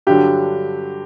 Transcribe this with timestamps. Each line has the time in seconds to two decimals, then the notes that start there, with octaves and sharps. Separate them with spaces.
0.07 G2 D3 F#3 G4